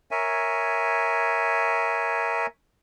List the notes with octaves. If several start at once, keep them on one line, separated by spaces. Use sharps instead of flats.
A#4 C#5 E5 G#5